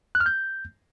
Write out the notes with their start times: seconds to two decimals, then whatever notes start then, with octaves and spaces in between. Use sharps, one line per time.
0.15 F#6
0.20 F6
0.26 G6